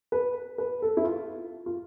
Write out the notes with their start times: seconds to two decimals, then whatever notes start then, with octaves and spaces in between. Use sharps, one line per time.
0.12 B4
0.58 B4
0.82 A4
0.97 E4
1.05 F4
1.66 F4